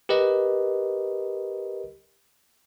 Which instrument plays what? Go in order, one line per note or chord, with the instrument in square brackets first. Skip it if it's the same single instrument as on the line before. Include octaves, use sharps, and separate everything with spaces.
[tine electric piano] G4 A#4 B4 D#5